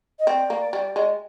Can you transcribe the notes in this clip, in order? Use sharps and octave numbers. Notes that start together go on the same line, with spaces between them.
D#5
C4 D5
A#3
G3
G#3